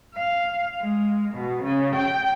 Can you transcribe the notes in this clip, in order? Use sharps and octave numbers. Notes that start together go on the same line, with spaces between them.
F5
G#3
B2
C#3
G5